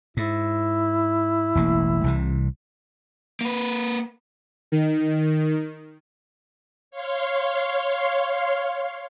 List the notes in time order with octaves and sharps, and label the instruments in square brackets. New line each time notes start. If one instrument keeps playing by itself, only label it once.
[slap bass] G#2 [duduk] E4
[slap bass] E1 A1 A#3
C2 C3 E3
[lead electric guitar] A#3 B4
[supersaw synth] D#3
[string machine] C#5 F5 C6